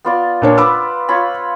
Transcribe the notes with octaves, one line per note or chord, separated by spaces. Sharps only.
B3 F4 D5
A#2 D4 C#5
B4 D6 E6
F4 C#5 B5